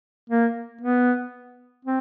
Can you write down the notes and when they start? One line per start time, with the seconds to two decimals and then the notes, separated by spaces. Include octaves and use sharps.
0.30 A#3
0.81 B3
1.85 C4